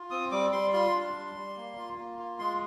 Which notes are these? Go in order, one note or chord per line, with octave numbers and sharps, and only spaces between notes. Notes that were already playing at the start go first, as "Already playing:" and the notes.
Already playing: F4
C4 D#6
G3 D6
G3 C6
F4 C6
D4
G3
G3
A#3
F4
A#3
F4
G#3 C6